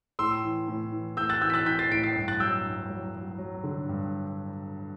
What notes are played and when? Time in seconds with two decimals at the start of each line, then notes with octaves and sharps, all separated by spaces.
0.19 A2 C6 E6
0.43 E3
0.68 A2
0.92 E3
1.17 A2 E6 G6
1.30 F#6 A6
1.41 E3 E6 G6
1.50 B6
1.54 F#6 A6
1.66 E3 G6 B6
1.79 A6 C7
1.91 A2 B6 D7
2.04 A6 C7
2.16 G2
2.28 F#6 A6
2.40 F#3 E6 G6
2.66 G2
2.89 F#3
3.15 F#3
3.39 F#3
3.64 D3
3.89 G2